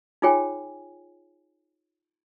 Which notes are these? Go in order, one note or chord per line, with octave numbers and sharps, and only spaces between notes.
D#4 F4 G#4 C#5 G5 G#5